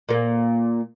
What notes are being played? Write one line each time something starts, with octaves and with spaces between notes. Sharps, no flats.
A#2 A#3